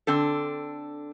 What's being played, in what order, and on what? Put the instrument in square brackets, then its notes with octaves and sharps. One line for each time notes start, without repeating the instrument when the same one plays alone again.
[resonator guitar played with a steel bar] D3 C4 D4 A4